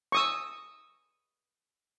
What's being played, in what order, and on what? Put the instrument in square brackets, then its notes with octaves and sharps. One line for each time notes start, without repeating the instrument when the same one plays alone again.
[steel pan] C#6 D#6 E6